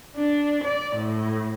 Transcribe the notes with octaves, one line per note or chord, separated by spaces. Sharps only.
D4
D5
A2